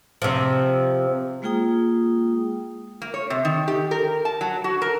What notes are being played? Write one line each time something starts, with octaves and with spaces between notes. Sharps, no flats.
C3 F3
G#3 A#3 F4 G#4 G5 D#6
A#3
C#5
C3
D#3
G4
A#4
A5
F#3
F#4
A#4